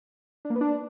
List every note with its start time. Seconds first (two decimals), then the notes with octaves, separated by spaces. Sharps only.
0.45 D4
0.50 A#3
0.55 B3
0.61 D4